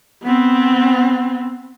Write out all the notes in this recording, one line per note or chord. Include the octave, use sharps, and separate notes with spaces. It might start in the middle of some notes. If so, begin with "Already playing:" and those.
B3 C4